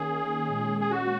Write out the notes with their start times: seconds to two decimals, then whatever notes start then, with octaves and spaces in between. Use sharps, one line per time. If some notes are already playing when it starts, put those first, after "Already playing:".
Already playing: D#3 A#3 C#4 G#4
0.47 A#2 G#3 C#4
0.81 G#4
0.91 F#4